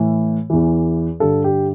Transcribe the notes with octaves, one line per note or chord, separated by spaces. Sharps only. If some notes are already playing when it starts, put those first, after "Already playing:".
Already playing: A2 E3
E2 E3
G2 D3 A4
G4